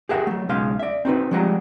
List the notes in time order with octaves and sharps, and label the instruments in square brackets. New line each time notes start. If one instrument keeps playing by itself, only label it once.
[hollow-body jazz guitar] G4 G#4 A#4 E5 F#5
F#3 A3
B1 C#3 G#3 F5 C6
D5 E5
C4 D#4 F#4 B4
F3 G3 G#3 G4 F#5 A#5